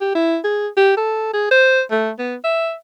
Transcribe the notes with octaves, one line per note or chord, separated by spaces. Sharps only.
G4
E4
G#4
G4
A4
G#4
C5
A3
B3
E5